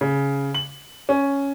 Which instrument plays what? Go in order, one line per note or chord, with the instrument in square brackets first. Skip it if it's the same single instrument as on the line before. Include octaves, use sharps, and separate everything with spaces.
[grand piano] C#3
F#7
C#4